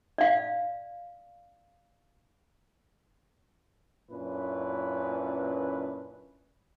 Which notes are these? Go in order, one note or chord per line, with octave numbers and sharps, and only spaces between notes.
D5 F5
F#2 A#2 C#4 D4 E4 B4